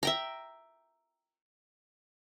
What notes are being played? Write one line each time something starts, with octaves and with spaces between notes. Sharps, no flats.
E5 G5 A#5